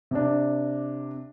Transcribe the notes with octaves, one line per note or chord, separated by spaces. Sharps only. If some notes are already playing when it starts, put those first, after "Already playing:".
C3 D4